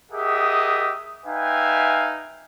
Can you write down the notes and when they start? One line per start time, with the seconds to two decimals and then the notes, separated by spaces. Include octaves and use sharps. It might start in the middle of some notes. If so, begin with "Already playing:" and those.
0.12 G4 G#4 A#4 D#5 E5 F#5
1.26 D#4 B4 E5 F5 G5 G#5